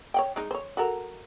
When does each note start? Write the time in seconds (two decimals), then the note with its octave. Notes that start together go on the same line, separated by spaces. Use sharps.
0.14 C#5 F#5 G5
0.36 G#3 D#4
0.51 C5 C#5
0.77 F#4 A4 A#4